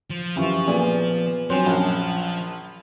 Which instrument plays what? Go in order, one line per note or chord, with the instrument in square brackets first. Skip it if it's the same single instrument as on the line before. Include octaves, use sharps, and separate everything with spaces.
[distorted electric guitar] F3
[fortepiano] F#2 E3 F4 [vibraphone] G4 C#6
[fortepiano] A#2 G#4 D5 [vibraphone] B3 B4
[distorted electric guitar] F3 [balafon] F#3 G#5 [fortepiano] C4 [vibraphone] D4 F4 F#4
[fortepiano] A#1 F#2 [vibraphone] A5